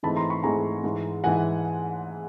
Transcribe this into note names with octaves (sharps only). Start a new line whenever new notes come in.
G#2 E3 A3 C4 D#4 A5 B5
A#5 C6
B5 C#6
G#2 E3 A3 C4 D#4 G#5 A#5
G#2 E3 G#3
G#2 E3 G#3 F#5 G#5